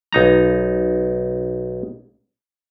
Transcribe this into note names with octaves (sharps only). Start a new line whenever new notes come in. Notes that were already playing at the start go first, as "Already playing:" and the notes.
B1 D#4 A#5